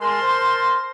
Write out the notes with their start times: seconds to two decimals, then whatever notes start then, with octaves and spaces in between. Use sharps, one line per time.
0.01 G#3 A#4 A5 C6
0.22 C5